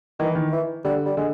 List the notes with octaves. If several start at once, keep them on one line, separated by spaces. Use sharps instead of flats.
D#3 E3
D#3
E3
D3 G3
G3
D3 G#3